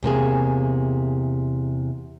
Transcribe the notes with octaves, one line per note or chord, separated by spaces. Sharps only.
E2 C3 A#3 G#4